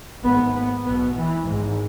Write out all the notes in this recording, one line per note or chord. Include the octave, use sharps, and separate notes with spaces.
G#1 G#2 B3
B3
B1 B2 B3
E3
G#2
G#1